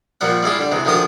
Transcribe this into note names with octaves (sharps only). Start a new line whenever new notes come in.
A#2 F3 G3 F#5
G3 G#3 E4 F4
D3 G3
C3 E3 G#3
D2 D#3 F3 G#3 G4 D#6